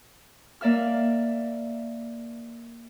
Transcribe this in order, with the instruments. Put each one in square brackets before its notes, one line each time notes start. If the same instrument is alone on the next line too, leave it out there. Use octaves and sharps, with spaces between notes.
[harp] A#3 D5 E5 F6